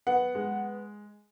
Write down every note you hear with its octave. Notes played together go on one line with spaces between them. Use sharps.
B3 F#5
G#3